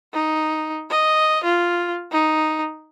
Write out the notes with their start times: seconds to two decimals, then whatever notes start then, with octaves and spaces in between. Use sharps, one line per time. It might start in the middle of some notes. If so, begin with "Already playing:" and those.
0.13 D#4
0.90 D#5
1.44 F4
2.12 D#4